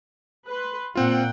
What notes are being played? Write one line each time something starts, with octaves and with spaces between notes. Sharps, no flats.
B4 C6
A#2 A#3 C4 F4 F#5 G5